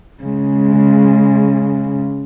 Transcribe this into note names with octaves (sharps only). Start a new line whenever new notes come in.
C#3 G#3